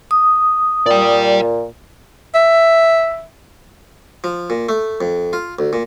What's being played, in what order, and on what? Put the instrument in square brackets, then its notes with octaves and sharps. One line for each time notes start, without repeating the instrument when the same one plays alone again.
[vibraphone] D#6
[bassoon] A#2 [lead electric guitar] D5 G5
[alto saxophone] E5
[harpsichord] F3
A#2
A3
F2
F4
D2
A#2